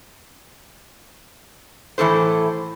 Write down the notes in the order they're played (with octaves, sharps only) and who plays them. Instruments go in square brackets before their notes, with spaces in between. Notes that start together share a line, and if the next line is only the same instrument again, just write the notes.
[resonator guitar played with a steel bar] A2 E3 C#4 A4 C5